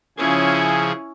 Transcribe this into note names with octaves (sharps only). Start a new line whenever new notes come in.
C#3 F3 C#4 E4 G#4